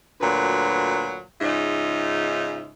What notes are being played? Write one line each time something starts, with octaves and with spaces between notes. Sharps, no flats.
D2 A#2 F#3 B4
G#2 C#3 D#4 F4 E5